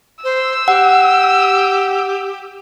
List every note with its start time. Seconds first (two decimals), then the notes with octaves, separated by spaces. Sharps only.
0.24 C5 E6
0.68 G4 F#5